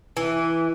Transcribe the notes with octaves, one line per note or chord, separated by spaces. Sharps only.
E3